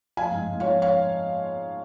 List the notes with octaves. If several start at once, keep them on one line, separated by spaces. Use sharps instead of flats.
F3 F5 G#5
G#2
G#2
F3 C#5 F5
C#5 F5